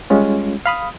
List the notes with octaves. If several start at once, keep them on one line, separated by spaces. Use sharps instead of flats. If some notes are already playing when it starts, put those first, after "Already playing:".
G3 G#3 C#4 F4
F5 B5 D#6